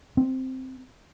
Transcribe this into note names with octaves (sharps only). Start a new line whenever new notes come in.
C4